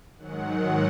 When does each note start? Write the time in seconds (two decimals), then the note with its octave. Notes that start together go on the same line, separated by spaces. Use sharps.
0.18 G#2 D#3 F#3 F#5